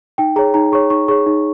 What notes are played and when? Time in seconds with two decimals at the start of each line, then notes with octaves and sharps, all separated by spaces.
0.18 D#4 G5
0.36 G#4 C#5 A#5
0.54 D#4 A#5
0.72 G#4 C#5 C#6
0.90 D#4 C#6
1.08 G#4 C#5 C#6
1.26 D#4